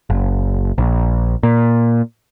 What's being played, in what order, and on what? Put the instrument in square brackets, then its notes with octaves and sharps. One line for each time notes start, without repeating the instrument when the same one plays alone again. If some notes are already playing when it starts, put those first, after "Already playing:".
[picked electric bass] F#1
A#1
A#2